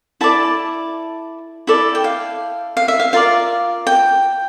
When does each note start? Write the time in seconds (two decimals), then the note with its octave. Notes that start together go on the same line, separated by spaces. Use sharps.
0.21 E4 A4 D5 A5
1.67 E4 A4 D5
1.95 G5
2.04 F5
2.77 F5
2.88 E5
3.00 F5
3.13 F4 A#4 D5 F5
3.87 G5